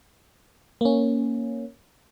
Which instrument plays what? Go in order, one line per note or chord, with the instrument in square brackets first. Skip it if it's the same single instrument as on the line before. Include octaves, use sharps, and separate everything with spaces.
[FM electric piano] A#3 C#4